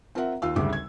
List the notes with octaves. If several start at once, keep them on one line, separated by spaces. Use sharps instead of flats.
C4 F4 A#4 C5 E5 F#5
D#2 F4 F5 E6
G#1 D2 C#3 G3 E5 D6
G#6